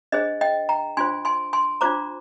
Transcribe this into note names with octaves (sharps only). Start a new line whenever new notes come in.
D4 G#4 C5 D#5
D#5 G5
G5 A#5
D4 F4 C5 G#5 C6
G#5 C6
G#5 C6
D4 F4 C5 A#5 D6